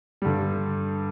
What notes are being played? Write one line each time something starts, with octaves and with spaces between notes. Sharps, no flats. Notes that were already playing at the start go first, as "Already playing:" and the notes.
G2 D3 G3